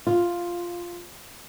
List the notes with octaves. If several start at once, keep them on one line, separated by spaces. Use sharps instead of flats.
F4